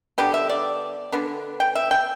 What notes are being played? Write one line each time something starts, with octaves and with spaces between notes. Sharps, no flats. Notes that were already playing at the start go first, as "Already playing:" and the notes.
D3 G3 B3 G4
E5
D5
D3 B3 D4
G5
E5
G5